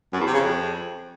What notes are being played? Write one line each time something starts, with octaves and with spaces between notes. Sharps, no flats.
F#2
E2
C3
C#3
F2